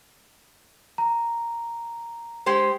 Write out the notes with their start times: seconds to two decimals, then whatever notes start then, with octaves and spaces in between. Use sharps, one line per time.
0.98 A#5
2.46 G#3 G4 C5